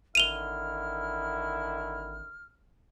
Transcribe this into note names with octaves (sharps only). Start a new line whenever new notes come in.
G#1 D3 D#3 E4 F6 D#7 F7 G7